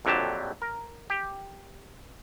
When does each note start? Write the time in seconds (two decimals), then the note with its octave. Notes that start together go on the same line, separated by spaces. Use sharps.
0.05 A#1 F2 D3 F#3 G4 A5
0.62 A#4
1.10 G4